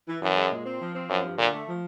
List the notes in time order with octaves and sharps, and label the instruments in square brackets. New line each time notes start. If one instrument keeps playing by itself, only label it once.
[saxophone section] E3
[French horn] F#2 [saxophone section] E3
[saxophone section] G#3
A#2
C4
F3
C4
[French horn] F#2 [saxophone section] F3
[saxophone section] G2
[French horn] A#2 [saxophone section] D3
[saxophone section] A3
F3